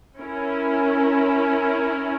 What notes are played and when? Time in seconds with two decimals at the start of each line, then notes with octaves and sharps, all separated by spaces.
0.20 C#4 E4 A#4